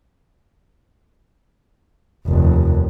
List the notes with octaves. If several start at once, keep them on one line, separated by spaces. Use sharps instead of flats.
F1 D#2